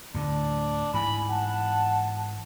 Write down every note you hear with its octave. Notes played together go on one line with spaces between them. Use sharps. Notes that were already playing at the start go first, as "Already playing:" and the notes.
D2 A2 D3 D4
G#2 E3 G#5 B5
F#5 A5